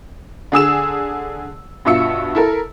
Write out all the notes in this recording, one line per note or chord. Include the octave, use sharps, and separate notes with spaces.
D3 G#4 E6 E7
G2 B2 F4 E5 E6 C#7
E4 A4 A#4